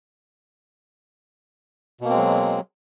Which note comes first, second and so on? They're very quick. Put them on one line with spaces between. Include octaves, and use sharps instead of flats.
B2 A#3 C4 G#3 F#3